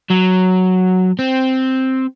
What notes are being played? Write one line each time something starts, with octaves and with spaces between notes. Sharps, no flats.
F#3
C4